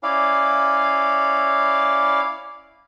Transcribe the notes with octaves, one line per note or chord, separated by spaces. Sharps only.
C#4 E4 D5 F5